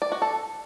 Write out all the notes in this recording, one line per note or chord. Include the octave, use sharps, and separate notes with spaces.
D5
F#4
A4